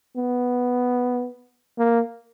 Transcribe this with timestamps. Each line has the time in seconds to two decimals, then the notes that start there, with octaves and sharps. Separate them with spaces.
0.17 B3
1.78 A#3